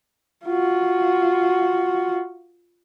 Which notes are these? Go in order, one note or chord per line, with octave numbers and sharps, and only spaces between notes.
F4 F#4